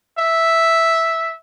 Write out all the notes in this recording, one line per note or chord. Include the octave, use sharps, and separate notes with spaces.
E5